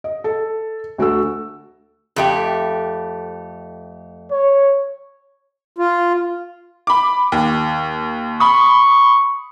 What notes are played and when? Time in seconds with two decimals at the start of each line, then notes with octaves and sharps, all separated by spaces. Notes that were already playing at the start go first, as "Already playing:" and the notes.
0.04 D#5
0.24 A4
0.98 D2 F#4 A4 E6
2.16 F2 A3 G4
4.31 C#5
5.78 F4
6.87 B5 D6
7.32 D#2
8.40 B5 C#6 D#6